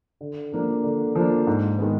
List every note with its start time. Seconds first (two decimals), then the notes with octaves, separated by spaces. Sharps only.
0.21 D3
0.53 F3 A#3 D4
0.84 D3
1.15 F3 A#3 D4
1.47 G#2
1.79 D#3 G#3 B3